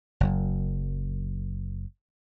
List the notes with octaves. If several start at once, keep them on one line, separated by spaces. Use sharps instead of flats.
F#1 F#2